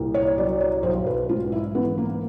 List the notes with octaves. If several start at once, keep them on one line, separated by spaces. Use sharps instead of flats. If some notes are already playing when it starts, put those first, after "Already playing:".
Already playing: C2 A#2
C#5
F#3 D5
C#5
B1 C5
B4
G#2 F4
E4
E3 B3
A#3